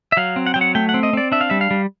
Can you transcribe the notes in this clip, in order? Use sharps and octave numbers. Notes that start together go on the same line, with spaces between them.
E5
F#3 F5
C4
F#5
F#3 G5
F#5
A3 G5
F#5
C4
D#5
C4 D5
D4 E5
F5
G3 E5
F5
G3